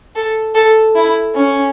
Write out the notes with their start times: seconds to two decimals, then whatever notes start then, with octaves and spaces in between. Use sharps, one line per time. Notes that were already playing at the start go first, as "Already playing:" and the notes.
0.16 A4
0.55 A4
0.95 E4
1.34 C#4